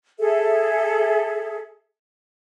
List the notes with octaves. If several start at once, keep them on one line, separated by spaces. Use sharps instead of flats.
G#4 A4 E5